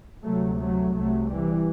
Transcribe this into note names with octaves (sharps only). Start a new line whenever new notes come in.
D2 C3 F#3 A3
F#3 A3
C2 C3 F#3 A3
E3 G3